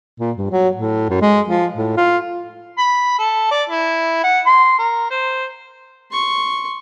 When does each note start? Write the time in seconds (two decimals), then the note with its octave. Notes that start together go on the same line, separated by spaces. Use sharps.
0.19 A#2
0.37 G2
0.51 F#3
0.76 A2
1.09 F#2
1.21 G#3
1.48 F3
1.74 A2
1.97 F4
2.78 B5
3.19 A4
3.51 D5
3.69 E4
4.24 F#5
4.46 C6
4.79 A#4
5.11 C5
6.12 C6 C#6